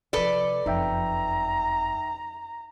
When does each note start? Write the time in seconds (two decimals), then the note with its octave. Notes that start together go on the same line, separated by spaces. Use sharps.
0.13 C3 F3 A4 B4 D5
0.66 F#1 F2 D#4 E5 G5 A#5